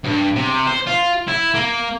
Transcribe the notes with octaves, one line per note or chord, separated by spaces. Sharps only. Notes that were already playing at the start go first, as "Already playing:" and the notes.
G2
C3
C5
F4
E4
A#3